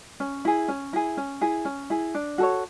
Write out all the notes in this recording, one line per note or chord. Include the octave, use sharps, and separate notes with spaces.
C#4
E4 G#4
C#4
E4 G#4
C#4
E4 G#4
C#4
E4 G#4
D4
F#4 A4 C#5